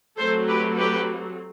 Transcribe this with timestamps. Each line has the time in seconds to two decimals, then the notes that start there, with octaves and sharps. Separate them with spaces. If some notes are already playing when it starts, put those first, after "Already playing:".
0.19 F#3 A3 C4 A4 C5
0.48 G4 B4
0.77 G4 B4